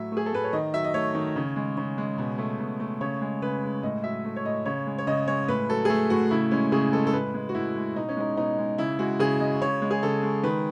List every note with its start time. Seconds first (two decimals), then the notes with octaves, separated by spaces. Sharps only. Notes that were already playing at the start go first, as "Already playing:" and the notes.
Already playing: A2 F#3 E5
0.12 A3 G#4
0.26 A4
0.33 A2 B4
0.44 C#5
0.53 D#3 D#5
0.74 F#3 E5
0.84 D#5
0.94 A3 C#5
1.15 D#3
1.36 C#3
1.56 G#3
1.77 C#3
1.98 G#3
2.18 B2
2.38 A3
2.59 B2
2.80 A3
3.01 C#3 C#5
3.21 G#3
3.42 C#3 B4
3.63 G#3
3.83 A2 D#5
4.04 F#3 E5
4.25 A3
4.36 C#5
4.45 A2 D#5
4.66 C#3 C#5
4.87 G#3
4.98 C#5
5.07 C#3 D#5
5.28 G#3 C#5
5.48 A2 B4
5.69 F#3 A4
5.85 G#4
5.90 A3 A4
6.10 A2 F#4
6.31 C#3 E4
6.51 G#3 C#4
6.72 C#3 G#4
6.93 G#3 A4
7.07 A4
7.13 A2 B4
7.34 G#3
7.49 F#4
7.55 A2 E4
7.75 G#3
7.96 B2 D#4
8.09 C#4
8.17 G#3 D#4
8.37 B2 D#4
8.58 G#3
8.78 C#3 E4
8.99 G#3 F#4
9.19 C#3 G#4
9.40 G#3 D#5
9.61 C#3 C#5
9.82 G#3
9.91 G#4
10.03 C#3 A4
10.23 G#3
10.43 D#3 B4